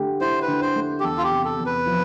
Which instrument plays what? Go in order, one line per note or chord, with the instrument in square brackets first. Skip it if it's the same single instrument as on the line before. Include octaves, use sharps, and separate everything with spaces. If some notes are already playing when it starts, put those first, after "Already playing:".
Already playing: [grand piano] D3 A3 G4
[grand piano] E4 [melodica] C5
[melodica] B4
[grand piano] D3
[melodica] C5
[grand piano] A3
[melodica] G4
[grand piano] E2 [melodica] A4
[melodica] F4
G4
[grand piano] C3
[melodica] A4
[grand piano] E2
[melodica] B4
[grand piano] F3